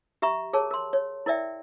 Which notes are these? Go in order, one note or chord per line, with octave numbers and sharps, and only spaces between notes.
G4 E5 A#5 C#6
G#4 A#4 C#5 A5
A#4 C6
C#5
E4 A#4 D5 E5 G5